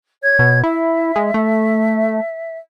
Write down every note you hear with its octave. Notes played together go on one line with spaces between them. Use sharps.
C#5 G#6
B2
E4 E5
G#3
A3